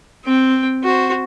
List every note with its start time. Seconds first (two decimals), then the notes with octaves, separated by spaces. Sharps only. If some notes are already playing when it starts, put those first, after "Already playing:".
0.25 C4 G5
0.84 F#4 C5